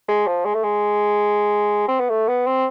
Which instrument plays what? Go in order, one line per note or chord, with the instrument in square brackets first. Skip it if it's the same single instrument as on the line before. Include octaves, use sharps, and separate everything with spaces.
[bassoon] G#3
F3
G#3
A3
G#3
C4
B3
A3
B3
C4